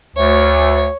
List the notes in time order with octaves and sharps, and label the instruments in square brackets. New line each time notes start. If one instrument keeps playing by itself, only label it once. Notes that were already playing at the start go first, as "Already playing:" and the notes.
[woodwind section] D2 [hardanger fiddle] C#5